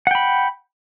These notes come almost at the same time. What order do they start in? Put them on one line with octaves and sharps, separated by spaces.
F#5 G5 B5